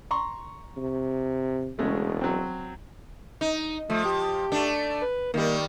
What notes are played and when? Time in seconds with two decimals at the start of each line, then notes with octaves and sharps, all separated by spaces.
0.11 A#5 C6 C#6
0.77 C3
1.79 E1 C#3 G#3 A3
2.21 F#3 C4
3.41 D#4
3.90 F3 A3
4.05 G4
4.52 A3 D4
5.02 B4
5.34 D#3 G3 A#3